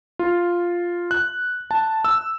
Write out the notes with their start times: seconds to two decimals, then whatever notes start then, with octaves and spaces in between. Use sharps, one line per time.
0.19 F4
1.11 F#6
1.71 A5
2.05 E6